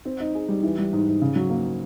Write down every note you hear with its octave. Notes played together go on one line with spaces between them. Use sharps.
C4
D#4
G#4
G3
E3
G3
G#2
G#2
C#3
F#3
A#3